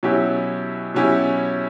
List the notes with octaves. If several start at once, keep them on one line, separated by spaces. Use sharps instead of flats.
B2 F#3 C#4 E4 G4
B2 F#3 C#4 E4 G4